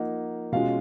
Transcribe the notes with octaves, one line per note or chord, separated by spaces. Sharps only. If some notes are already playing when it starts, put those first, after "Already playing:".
Already playing: F3 A#3 D#4 F#5
B2 G#3 C#4 F4 F5